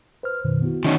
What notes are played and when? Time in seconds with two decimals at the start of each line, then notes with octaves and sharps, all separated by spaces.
0.23 B4 C5 F6
0.44 F#2 B2 D#3
0.62 B3 E4 F#4
0.85 D#3 C#4 D#4